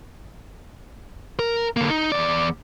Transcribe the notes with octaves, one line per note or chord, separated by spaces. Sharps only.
A#4
D3 A#3
D#4
E2 D5